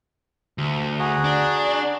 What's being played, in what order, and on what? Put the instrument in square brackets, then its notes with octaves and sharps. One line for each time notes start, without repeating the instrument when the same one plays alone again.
[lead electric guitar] D2
[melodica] F#4 G#4 A#5
[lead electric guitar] D4